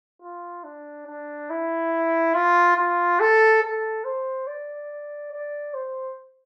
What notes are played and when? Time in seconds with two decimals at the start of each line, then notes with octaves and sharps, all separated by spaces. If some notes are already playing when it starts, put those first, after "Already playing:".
0.22 F4
0.64 D4
1.07 D4
1.50 E4
2.34 F4
2.77 F4
3.20 A4
3.63 A4
4.05 C5
4.47 D5
5.32 D5
5.74 C5